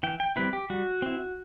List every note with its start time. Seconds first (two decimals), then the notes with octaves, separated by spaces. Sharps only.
0.03 E3 G5
0.20 G5
0.36 G3 C4 E4 B4
0.53 G4
0.70 G3 F#4
1.02 C4 E4